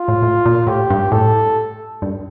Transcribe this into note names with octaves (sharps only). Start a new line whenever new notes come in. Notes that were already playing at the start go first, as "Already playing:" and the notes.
Already playing: F4
A2
A2
A#2
A2 G4
G2
A2 A4
G2